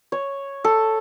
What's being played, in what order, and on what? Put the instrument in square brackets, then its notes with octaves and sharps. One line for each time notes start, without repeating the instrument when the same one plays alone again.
[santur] C#5
A4